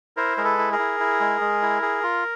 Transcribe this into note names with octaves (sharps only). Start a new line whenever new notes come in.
E4 A#4 C5
G#3 A#4
A4 B4
E4
G#4 A#4
E4
E4
G#3
G#3
E4
G#4
F4